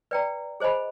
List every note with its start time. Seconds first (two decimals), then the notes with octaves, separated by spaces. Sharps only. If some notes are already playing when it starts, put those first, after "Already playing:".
0.11 B4 D5 G5 A#5
0.60 G#4 C5 D#5 G#5 B5